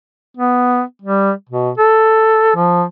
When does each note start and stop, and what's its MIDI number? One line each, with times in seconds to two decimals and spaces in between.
0.37 0.82 59
1.02 1.31 55
1.49 1.70 47
1.77 2.52 69
2.56 2.84 53